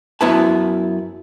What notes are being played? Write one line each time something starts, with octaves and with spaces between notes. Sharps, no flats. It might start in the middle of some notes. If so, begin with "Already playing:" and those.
F#2 B3 E4 B4 A5